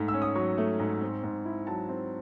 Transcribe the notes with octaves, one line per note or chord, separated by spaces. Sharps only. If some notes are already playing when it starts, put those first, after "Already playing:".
Already playing: G#2 A3
E6
C#4
D#6
F#3 C#6
A3
G#2
C4
G#2
E4
F#3 A5
C4